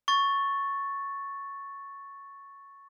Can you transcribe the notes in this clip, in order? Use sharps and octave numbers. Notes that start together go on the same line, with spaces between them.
C#6 A6